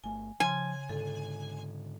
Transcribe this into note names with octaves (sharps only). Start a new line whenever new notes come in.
G1 A3 G#5
C#3 F3 G#5 C6
G#2 D3 A4